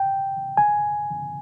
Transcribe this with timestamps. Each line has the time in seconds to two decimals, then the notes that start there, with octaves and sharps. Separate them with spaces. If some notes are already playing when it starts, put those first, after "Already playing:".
Already playing: G5
0.57 G#5